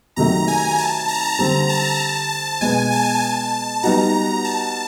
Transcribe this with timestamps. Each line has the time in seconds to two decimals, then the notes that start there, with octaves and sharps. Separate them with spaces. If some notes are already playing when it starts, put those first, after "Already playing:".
0.16 C3 D#3 F#3 A3 A#5
0.48 G#5
0.78 A5
1.08 A#5
1.39 D3 G3 C4 A#5
1.69 A5
2.31 A5
2.61 B2 G#3 B3 G#5
2.92 A5
3.23 A5
3.83 G3 B3 D#4 F#4 A#5
4.14 A#5
4.45 A5